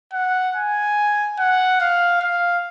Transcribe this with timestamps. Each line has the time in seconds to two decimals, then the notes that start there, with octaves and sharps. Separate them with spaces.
0.13 F#5
0.56 G#5
1.39 F#5
1.81 F5
2.22 F5